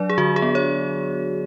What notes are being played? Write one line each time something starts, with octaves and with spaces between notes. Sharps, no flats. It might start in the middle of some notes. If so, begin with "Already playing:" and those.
Already playing: F#3 D4 D5
G#4
D3 F#4
G#4
B3
C#5